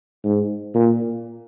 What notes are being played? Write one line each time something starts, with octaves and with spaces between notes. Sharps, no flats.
G#2
A#2